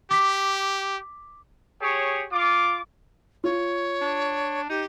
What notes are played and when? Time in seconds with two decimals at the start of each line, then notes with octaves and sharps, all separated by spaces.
0.11 G4 D6 B6
1.82 G4 G#4 C#5
2.32 F4 D6
3.44 F4 C#5
4.01 D4
4.69 D#4 G4